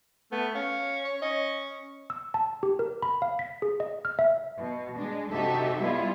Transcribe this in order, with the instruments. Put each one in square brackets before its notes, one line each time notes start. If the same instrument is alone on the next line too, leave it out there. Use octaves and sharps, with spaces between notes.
[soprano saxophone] A3 [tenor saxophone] B3
[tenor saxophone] C#4 [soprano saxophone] F5
[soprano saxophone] C#5
[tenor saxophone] C#4 [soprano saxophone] D#5
[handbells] E6
A5
G4
A#4
B5
F5
B6
G#4
D#5
F6
E5
[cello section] B2
G#3 D4
C3 D#4 F#4 G4 A4 E5
G3 G#3 B3 E4 F4